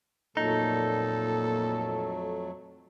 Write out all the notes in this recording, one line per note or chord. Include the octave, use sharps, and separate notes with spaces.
F2 A#2 F#3 A3 D#4 A4